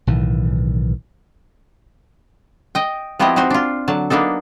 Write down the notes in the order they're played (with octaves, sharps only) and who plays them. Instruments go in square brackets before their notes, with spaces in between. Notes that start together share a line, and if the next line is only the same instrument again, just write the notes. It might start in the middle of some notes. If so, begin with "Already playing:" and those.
[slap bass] B1 A2 D#3 E3
[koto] D#5 G5
F3 B3 C4 E4 G4 D#5
C4 D#4 F#4 C5
D4 F4
D3 F#3 A5
A#3 B3 D4 D#4 A4